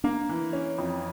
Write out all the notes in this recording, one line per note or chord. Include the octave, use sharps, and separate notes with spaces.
A#3 D4
E3
C#4
F2